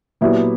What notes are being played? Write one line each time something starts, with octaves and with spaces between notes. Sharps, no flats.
A#2 F#3 B3 E4 G4